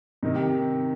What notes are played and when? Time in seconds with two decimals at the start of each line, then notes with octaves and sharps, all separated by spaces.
0.23 C3 D#3 D#4
0.35 G4